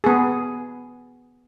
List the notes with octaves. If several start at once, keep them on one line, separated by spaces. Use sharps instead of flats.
B3 G#4